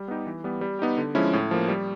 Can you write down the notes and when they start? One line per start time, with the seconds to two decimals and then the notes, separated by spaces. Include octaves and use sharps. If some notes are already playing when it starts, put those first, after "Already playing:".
Already playing: G3
0.08 B3 D#4 G4
0.26 E3
0.44 G3 B3
0.61 G3
0.79 B3 D#4 G4
0.98 D3
1.15 F3 G#3 C#4 E4
1.33 A2
1.51 F3 A#3
1.68 G3